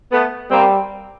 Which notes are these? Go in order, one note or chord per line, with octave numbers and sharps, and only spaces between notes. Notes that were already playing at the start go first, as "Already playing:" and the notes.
A3 B3
G3 A#3 C4